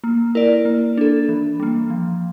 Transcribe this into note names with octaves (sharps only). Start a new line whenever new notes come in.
A#3
E4 A#4 D5
A#3
D4 A4
E3
G3 A#3
F3